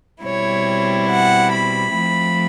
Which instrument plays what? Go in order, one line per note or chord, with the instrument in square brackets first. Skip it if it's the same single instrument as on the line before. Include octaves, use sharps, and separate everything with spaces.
[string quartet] B2 G3 C4 E4 C#5
F#5
B5
F3 A3 C4